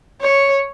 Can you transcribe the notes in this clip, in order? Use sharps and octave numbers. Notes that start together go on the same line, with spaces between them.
C#5